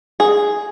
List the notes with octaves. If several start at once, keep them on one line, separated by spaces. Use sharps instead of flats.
G#4